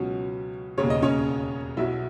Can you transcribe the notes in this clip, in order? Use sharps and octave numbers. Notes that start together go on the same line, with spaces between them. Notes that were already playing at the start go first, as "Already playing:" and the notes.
Already playing: C#2 B2 F#3 C#4
E1 D#2 C#3 C#5
D#5
C#4 C#5
B1 B2 F#3 E4 E5